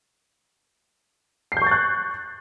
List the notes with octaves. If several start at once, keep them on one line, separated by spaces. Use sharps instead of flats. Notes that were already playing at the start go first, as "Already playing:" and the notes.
C#6 F#6 G6 A6 C7